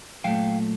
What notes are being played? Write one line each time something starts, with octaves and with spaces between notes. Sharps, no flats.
A#2 F#3 A3 F5 G5